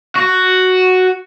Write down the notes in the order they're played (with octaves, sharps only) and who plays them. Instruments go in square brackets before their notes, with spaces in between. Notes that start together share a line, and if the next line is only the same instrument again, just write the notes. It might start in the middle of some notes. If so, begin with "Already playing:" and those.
[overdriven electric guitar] F#4